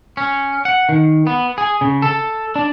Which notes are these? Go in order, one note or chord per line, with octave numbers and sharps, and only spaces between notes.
C#4
F#5
D#3
B3
G#4
C#3
A4
D4